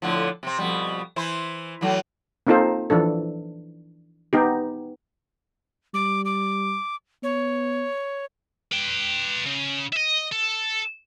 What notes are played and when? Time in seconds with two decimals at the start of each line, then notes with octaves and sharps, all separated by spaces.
0.02 A2 D3 F3
0.43 C3 C4
0.58 F2 B2 G3
1.16 E3 E4 C5
1.81 E3 F#3 A3
2.47 A#3 C4 D#4 F4 A4 C5
2.90 E3 F3 D4 A4
4.33 B3 D#4 G4
5.94 G3 D6
6.25 D6
7.23 B3 C#5
8.72 B4 G5
9.46 C#3
9.93 D#5 E5
10.32 A4